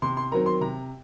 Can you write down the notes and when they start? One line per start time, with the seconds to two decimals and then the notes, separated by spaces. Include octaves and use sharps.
0.02 C3 C6
0.17 C6
0.31 D#3 F#3 C4 A#5
0.46 C6
0.61 C3 A#5